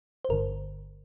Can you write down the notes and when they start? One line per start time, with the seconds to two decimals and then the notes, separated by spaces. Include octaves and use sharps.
0.25 C5
0.29 G1 G2 D3 A#4